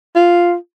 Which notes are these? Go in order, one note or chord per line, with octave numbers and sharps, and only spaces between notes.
F4